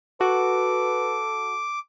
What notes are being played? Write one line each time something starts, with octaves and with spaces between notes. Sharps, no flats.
F#4 A4 B4 D6